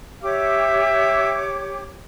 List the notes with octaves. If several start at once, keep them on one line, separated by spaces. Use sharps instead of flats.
G4 C#5 E5 D6